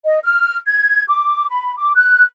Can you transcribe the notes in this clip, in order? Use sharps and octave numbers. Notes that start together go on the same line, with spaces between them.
D#5
F6
G#6
D6
B5
D6
F#6